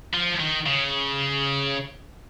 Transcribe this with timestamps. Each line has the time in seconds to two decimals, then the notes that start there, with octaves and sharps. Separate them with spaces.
0.14 F3
0.40 D#3
0.67 C#3